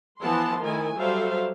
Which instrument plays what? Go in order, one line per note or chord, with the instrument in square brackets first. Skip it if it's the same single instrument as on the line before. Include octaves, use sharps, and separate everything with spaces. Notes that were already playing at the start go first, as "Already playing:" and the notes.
[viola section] E3 F3 B3 E4 A5 C6
D#3 A3 E4 G#5
F#3 G3 A4 C5 E5 F5